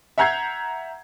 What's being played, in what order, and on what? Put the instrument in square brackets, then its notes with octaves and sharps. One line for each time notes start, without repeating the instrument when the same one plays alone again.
[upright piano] E5 F#5 A#5 G6 G#6 C7